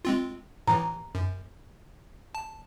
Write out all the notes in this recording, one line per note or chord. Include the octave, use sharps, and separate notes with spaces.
G#3 C4 F4
A2 E3 A#5
F#2
A5